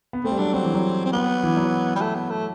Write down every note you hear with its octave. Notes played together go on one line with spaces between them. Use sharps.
B3
A3 C4
G3
F#3 D4
F#3 C4
E3
F#3
C4
B3
E3
F#3
G3
A3
B3
A3